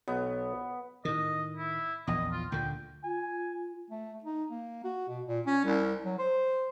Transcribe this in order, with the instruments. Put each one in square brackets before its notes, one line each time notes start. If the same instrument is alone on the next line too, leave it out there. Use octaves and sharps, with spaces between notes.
[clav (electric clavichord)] B1 [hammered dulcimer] B3
[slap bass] A2 D#3 [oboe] D#5
[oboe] E4
[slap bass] A#1 E2 [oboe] D#5
[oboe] F4
[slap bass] D2 A#2 D3 [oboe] G5
[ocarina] F4 [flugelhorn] G#5
[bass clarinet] A3
D#4
A#3
F#4
B2
A#2
C#4
C2
F#3
C5